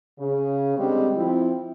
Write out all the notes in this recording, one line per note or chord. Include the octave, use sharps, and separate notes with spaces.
C#3
D3 G3 G#3 C4
F3 C4 E4